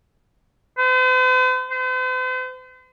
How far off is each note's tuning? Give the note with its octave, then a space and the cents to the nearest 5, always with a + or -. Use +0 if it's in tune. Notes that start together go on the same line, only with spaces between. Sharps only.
C5 -45
C5 -45